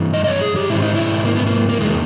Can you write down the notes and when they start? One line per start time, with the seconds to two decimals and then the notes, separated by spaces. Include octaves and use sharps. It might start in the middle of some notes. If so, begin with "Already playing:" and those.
Already playing: G2 E3
0.14 D#5
0.24 D#5
0.27 C#5
0.42 G#4
0.56 G4
0.69 G#2 D#3 E4
0.82 D#4
0.95 E4
1.24 A#3
1.36 B3
1.46 A#3
1.69 A#3
1.80 E2 D#3 G#3